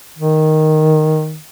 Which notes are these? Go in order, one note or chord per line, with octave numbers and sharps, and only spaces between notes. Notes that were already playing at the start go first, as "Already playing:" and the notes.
D#3